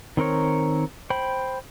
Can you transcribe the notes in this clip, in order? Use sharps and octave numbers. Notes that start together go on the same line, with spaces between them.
D#3 C4 A#4 C#5
C5 G5 B5